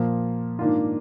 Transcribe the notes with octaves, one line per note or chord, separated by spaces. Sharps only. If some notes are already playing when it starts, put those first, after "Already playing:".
Already playing: A#2 F3 A#3
G#2 D#3 A#3 D4 F4